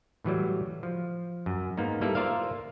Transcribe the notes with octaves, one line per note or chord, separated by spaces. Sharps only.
A2 E3 F#3 G3
F3
F#2
G#2 A#3 B3 D#4
G3 A#3 E4 A4 B4 E5
F4 A#4 C5 D5 E5 F5